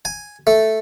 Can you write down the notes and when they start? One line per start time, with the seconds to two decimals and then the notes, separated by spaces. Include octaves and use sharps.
0.05 G#5
0.47 A3